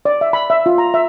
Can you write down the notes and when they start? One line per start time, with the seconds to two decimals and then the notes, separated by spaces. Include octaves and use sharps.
0.05 D5
0.21 E5
0.33 B5
0.50 E5
0.66 F4
0.78 A#5
0.94 E5